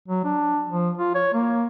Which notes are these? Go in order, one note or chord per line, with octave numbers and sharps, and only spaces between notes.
F#3
D4
F3
F4
C#5
A#3